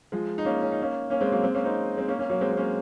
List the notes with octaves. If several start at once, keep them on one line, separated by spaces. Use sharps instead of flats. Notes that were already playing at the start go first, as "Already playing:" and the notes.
F3 G#3
D#4
A#3 C#4
C#4
D#4
A#3 C#4
A#3 C#4
G#3 C4
F#3 A#3
G#3 C4
A#3 C#4
C4 D#4
G#3 C4
A#3 C#4
A#3 C#4
F#3 A#3
G#3 C4
C4
A#3 C#4